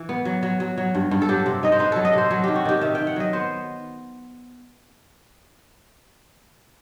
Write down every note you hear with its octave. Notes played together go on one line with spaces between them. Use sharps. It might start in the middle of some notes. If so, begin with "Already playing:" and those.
Already playing: E3
B3
F#3
F#3
F#3
F#3
G2
G2
A4
F#3 G4
C3
D#4 D#5
C5
D#4 B4
F#3 A4
D#5
C3 C5
F#3 A4
D#3 G4
F#4
D#3 G4
D#3 E5
D#3 G5
F#5
F#3 D#5
B3 C5